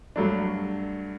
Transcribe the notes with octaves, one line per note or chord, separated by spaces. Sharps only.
G2 F#3 A3 D4